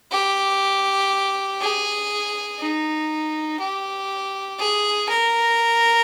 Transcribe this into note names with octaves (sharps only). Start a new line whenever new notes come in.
G4
G#4
D#4
G4
G#4
A#4